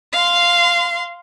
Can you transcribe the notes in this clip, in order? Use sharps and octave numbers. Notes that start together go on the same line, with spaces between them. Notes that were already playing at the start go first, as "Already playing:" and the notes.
F5 C6